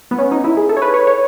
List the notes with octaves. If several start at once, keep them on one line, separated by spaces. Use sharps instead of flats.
B3
C#4
D#4
E4
G#4
A4
C#5
B4
C#5
C#5